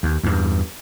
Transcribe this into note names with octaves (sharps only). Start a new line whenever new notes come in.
D#2
E2 G2